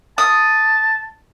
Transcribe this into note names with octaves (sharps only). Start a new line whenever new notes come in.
A5 D#6